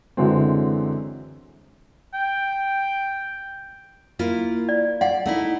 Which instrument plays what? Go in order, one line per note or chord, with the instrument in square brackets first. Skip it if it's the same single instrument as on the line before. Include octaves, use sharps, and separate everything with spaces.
[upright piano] F#2 D3 E3 F#3 G#3 C4
[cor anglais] G5
[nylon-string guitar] A#3 E4 F4
[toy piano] D5
[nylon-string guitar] D5 [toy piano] F5 F#5
[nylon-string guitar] A3 D#4 E4